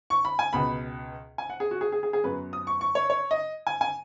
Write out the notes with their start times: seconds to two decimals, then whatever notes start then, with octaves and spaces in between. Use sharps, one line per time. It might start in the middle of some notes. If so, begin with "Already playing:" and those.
0.10 C#6
0.25 B5
0.39 G#5
0.53 C#2 B2 B3 B5
1.38 G#5
1.50 F#5
1.60 G#4
1.71 F#4
1.81 G#4
1.92 G#4
2.03 G#4
2.13 G#4
2.24 F#2 F#3 B3 B4
2.53 D#6
2.67 C#6
2.81 C#6
2.95 C#5
3.10 C#5
3.31 D#5
3.67 G#5
3.81 G#5